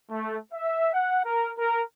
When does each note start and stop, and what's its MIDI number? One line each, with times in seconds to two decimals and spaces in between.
0.10 0.36 57
0.52 0.93 76
0.94 1.22 78
1.25 1.50 70
1.58 1.82 70